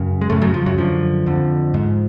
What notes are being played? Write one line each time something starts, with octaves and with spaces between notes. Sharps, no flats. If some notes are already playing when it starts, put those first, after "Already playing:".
Already playing: F#2 C#3
G#3
F#2 A2 C#3 A3
F#2 F#3
F3
F#2 F#3
F#2 D3 F3
F2 D3
G#2